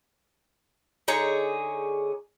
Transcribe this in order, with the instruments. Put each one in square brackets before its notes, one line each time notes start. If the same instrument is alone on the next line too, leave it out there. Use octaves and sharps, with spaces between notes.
[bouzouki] D3 D#4 G#4 C#5